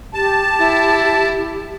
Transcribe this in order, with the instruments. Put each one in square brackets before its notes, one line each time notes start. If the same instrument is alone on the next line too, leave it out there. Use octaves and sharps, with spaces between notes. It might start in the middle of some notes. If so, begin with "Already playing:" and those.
[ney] G4 [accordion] A5
[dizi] E4